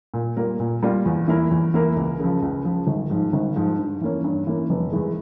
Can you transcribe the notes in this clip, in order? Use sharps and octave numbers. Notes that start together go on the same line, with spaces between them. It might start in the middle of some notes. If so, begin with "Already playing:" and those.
A#2
G3 A#3 F4 A#4
A#2
G3 A#3 F4 A#4
E2
E3 A#3 E4 A#4
E2
E3 A#3 E4 A#4
C#2
C#3 F3
C#2
C#3 F3
G#1
G#2 F3
G#1
G#2 F3
G2
E3 A#3 C#4
G2
E3 A#3 C#4
F1
E2 E3 G#3